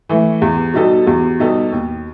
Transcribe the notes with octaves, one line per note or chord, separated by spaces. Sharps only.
E3 A3
E2 G4
B2 G3 D#4 F#4 A4
E2 G4
B2 G3 D#4 A4
D#2